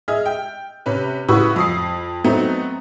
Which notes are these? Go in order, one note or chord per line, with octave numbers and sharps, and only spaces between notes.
G#4 D#5 E5 F6
G5
C3 C#4 B4
A2 C#3 F#4 B4 C#6 E6
F2 D#6 C7
F#3 A3 B3 C4 D#4